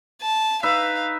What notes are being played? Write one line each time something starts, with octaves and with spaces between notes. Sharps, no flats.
A5
D#4 B4 E5 F5